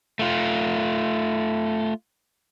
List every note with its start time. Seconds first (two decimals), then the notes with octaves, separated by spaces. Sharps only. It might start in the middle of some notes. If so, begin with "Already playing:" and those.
0.19 A3 F4